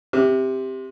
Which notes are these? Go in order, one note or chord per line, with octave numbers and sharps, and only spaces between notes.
C3